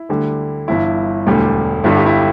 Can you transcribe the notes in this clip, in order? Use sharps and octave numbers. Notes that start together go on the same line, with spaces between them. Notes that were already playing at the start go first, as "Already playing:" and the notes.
Already playing: E4
D2 D3 G3
G1 G2 E3 E4
E1 D2 D3 G3
G1 G2 D3 G3 E4
G4
E4